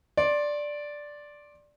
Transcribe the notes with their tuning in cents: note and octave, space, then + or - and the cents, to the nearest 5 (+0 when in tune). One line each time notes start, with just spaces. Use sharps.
D5 +0 C6 +30